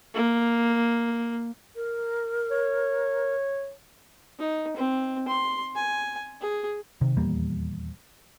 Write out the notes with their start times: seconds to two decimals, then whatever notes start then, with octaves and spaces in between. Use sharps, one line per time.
0.14 A#3
1.76 A#4
2.51 C#5
4.39 D#4
4.77 C4
5.28 C6
5.76 G#5
6.41 G#4
7.01 C3 D#3
7.16 D#1 E2 G3 A#3